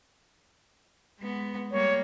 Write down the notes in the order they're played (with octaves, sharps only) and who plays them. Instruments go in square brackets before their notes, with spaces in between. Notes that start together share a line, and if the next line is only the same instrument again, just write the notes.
[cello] G#3 B3
[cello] G3 A#3 [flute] C#5